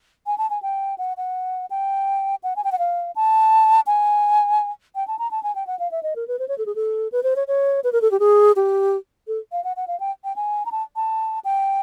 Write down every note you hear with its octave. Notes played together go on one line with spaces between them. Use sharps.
G#5
A5
G#5
G5
F#5
F#5
G5
F#5
G#5
G5
F#5
F5
A5
G#5
G5
A5
A#5
A5
G#5
G5
F#5
F5
E5
D#5
A#4
B4
C5
C#5
A4
G#4
A4
B4
C5
C#5
C#5
B4
A#4
A4
G4
G#4
G4
A4
F5
F#5
F#5
F5
G5
G5
G#5
A#5
A5
A5
G5